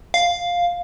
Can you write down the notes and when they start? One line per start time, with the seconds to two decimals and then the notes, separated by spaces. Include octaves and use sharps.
0.14 F5